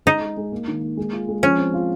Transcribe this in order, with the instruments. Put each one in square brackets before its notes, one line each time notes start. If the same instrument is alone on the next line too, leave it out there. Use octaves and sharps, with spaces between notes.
[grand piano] G#3 [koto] D#4
[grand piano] G#3
G#3
A#3
D#3
A#3
G#3
F4
G#3
[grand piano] F3 [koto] C#4
[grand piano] C4
F4